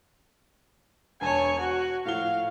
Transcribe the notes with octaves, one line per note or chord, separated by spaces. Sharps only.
E1 C#5 G#5 A5
F#4 C#6
A2 F3 F5 G7